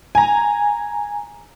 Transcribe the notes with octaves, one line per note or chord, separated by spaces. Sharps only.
G#5 A#5